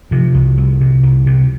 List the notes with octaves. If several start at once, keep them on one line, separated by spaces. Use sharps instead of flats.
C3 F3
C2
C2
C3
C2
C3